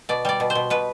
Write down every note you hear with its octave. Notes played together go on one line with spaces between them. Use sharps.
B2 D5
G3 D5
B2
C5
B2
B2 B4